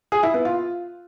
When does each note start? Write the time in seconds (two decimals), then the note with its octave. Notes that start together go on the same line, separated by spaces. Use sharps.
0.12 G#4
0.23 E4
0.34 B3
0.45 F4